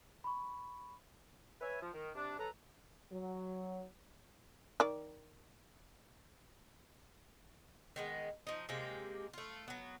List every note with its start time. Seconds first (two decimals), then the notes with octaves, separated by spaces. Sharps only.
0.24 B5 C#6
1.61 B4 C#5 E5 G#5
1.81 F3
1.94 D#3
2.15 C3 D4
2.38 F#3 A4 B4 A#5
3.12 F#3
4.80 D#3 D5
7.96 D#3 G#3 B3
8.47 F3 D#4
8.69 C3 G#3 A#3 G4
9.33 A3 F4
9.68 F#3 B3